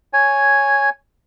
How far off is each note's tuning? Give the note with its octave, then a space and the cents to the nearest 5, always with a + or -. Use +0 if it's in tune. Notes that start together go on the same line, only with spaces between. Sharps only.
C#5 +0 G#5 +0